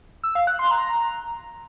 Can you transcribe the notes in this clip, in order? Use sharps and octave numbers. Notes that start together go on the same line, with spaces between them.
E6
F5
F#6
C6
A#5